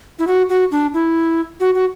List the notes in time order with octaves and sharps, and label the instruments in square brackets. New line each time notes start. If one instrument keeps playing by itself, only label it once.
[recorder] E4
F#4
F#4
D4
E4
F#4
F#4